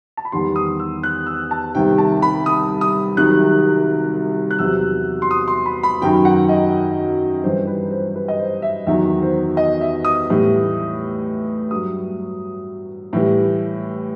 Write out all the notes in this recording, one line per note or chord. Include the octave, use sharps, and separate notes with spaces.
A5
B5
E2 D#3 G3 C6
D#6
E6
F#6
E6
A5
C2 C3 D#3 G5
A5
B5
D#6
D#6
C2 C3 D#3 F#3 F#6
F#6
E2 C3 F#3 E6
C6
D#6
C6
B5
B5
F#2 D#3 F#3 G5
F#5
D#5
G2 E3 G3 C5
B4
C5
B4
D#5
C5
E5
E2 D#3 F#3 E5
C5
D#5
E5
D#6
A2 E3 G3
G2 F#3 D#6
A2 E3 G3